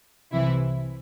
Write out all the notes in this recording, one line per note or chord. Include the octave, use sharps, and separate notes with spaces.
C2 C3 E3 E4